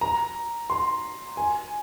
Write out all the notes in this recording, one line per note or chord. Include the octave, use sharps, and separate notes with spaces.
A#5
C6
G#5